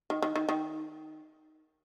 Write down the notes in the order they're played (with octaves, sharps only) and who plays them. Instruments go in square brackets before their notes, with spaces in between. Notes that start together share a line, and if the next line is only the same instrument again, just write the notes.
[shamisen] D#3
D#3
D#3
D#3